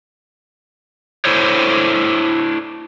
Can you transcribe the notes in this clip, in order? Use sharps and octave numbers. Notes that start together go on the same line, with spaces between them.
D4 E4 A4 C5 C#5